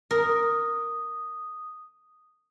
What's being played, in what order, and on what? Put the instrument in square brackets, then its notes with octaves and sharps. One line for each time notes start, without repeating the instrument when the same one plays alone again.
[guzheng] A#4 [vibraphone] D#6